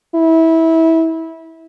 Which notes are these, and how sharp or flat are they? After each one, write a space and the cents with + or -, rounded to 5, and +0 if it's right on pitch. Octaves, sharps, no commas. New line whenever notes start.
E4 -20